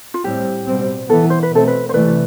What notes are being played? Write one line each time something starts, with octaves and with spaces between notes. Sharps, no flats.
F4
A2 G3 C4 G4
B2 G3 C4
E3 B3 A4
C5
B4
B2 A3 C4 A4
B4
C5
C3 E3 A3 B4 D5